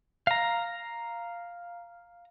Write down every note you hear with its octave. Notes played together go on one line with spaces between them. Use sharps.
F5 A#5